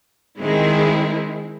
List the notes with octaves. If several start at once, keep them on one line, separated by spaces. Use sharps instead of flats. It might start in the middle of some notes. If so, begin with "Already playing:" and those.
D#3 G#3 C4 E4 G#4